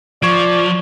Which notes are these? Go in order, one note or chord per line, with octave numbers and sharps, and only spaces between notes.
F3 D5 C#6 G#6 D7